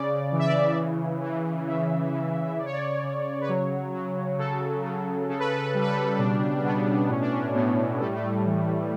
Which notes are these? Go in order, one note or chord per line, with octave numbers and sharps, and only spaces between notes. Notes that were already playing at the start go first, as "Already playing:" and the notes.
Already playing: C#3 D5
E3
E5
D5
E5
C#3
E3
C#3 E5
C#3
C#3 D5
C#5
D5
C#3
B4
F#3 C#5
F#3
C#3 A4
C#3
C#3 A4
B4
A4
B4
G3 A4
B4
A4
B2 D4
B2 B3
A2 C#4
D4
C#4
A2 B3
G3 A3
A3
E3